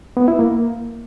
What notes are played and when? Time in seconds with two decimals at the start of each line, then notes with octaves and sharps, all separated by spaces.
0.17 B3
0.28 E4
0.39 A#3